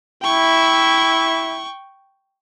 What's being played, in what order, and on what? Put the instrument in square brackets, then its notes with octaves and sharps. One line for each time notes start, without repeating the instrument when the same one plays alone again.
[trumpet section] E4 [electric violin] G5 C#6